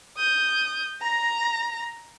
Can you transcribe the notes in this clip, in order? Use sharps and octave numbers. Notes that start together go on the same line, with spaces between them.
D#6 G6
A#5 A#6